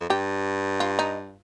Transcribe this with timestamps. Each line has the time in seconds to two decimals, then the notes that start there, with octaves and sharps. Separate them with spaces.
0.01 F2
0.09 G2 G4
0.80 F4
0.99 D#4